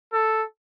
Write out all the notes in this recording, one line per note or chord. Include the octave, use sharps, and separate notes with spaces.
A4